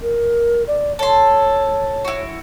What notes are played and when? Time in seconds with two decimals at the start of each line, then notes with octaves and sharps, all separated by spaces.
0.02 A#4
0.67 D5
0.99 A4 C#5 C6
2.05 E4 F#4